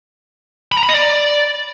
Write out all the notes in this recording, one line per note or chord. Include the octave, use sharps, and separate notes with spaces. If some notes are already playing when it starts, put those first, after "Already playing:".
B5
A#5
B5
D#5
D5